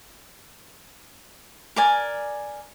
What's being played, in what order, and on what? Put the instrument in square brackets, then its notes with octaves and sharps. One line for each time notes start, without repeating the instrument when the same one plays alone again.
[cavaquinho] A#4 D5 G#5